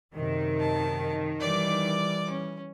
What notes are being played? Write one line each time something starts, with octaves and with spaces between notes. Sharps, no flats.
F#2 C3 D#3
A5
E3 G3 D5 D6
C#4